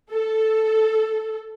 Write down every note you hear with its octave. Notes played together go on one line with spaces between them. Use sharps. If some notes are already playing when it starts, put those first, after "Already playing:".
A4